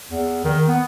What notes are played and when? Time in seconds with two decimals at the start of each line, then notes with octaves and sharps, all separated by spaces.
0.11 E2
0.45 D#3
0.68 B3